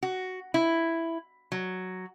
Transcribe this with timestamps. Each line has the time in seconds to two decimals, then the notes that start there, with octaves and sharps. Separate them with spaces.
0.03 F#4
0.54 E4
1.52 F#3